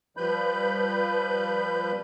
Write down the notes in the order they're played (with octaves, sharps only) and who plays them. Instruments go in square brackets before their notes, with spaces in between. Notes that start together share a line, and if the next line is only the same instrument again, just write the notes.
[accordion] F3 G3 B4 B5 G6